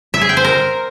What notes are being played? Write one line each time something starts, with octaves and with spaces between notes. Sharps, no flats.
E5
G#4
G5
C5
A#4